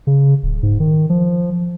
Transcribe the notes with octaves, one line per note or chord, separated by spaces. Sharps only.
C#3
D1
G#2
D#3
F3